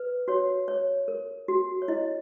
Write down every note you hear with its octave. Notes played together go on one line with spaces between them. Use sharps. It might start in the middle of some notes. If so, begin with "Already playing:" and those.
Already playing: B4
F#4 C#5
C#5
A#4
F#4
C#5
E4 D#5